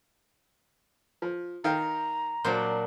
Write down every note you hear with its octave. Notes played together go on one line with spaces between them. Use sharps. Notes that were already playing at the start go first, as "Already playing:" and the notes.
F3
D#3 F5 G5 A#5
A#2 F#3 D4 C5